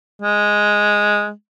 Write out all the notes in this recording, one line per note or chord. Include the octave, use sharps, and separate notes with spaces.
G#3